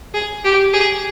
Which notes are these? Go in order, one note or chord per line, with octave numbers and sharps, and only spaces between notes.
G#4
G4
G#4